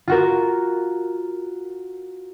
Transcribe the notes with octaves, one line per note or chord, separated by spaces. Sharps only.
F4 F#4 A#4